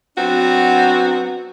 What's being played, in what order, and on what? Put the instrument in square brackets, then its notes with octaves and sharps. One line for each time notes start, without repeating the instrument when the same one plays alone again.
[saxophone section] F#3 B3 C4 D4 F#4